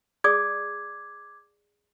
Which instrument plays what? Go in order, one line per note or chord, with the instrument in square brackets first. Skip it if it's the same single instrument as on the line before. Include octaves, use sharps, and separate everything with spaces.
[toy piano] G#4 D5 D#6 [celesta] D6 G#6